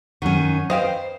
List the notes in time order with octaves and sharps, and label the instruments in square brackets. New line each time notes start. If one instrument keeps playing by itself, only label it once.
[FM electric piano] F#2 F#5 C#6 [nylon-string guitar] D#3 C#4
[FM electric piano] B4 C7 [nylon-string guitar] C5 [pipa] D#5 F5 G5